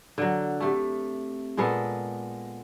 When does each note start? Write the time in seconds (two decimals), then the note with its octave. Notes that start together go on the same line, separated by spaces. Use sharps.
0.18 D3 F#3
0.60 C3 A3
1.57 A#2 G#3 B3 A4